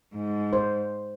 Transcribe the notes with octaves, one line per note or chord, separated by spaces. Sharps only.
G#2
C5